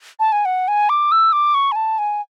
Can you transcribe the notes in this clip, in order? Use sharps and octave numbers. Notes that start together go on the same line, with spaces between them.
A5
G#5
F#5
G#5
D6
E6
D6
C#6
G#5
A5
G#5